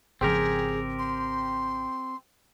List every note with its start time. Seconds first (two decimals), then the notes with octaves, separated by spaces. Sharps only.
0.21 G#1 C#3 F3 C4 G4 G#4 A#4
0.99 C6